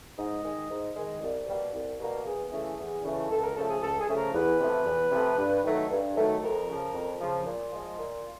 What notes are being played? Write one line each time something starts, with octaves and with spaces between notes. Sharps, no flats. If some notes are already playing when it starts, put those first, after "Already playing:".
G#2 D#5
D#3 G#3
G#2
D#3 G#3
C2 D5
B2 G3 A#3
C2
B2 G3 A#3
E2 G#4
C#3 E3 A3
E2
C#3 E3 A3
C#2 A4
A#4
C#3 F3 A3 A4
G#4
C#2 A4
G#4
C#3 F3 A3
A#4
E2 B4
C3 F3 A3
E2
C3 F3 A3
G2
D#3 F#3 A3
G2
D#3 F#3 A3
F2 A#4
C#3 F3
F2
C#3 F3
A#2 F4
F3 G#3
A#2